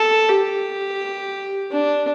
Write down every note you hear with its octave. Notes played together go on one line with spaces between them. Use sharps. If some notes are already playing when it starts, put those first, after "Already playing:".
Already playing: A4
G4
D4